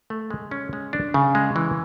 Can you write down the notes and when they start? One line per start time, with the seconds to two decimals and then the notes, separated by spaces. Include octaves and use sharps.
0.10 A3
0.30 G#3
0.51 C#4
0.73 G#3
0.93 D4
1.14 C#3
1.35 G#3
1.56 E3